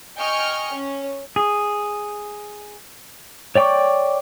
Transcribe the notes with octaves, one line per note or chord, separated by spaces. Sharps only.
D#5 G5 G#5 C#6 F6 C#7
C#4
G#4
C#5 D5 G5 C#6 D6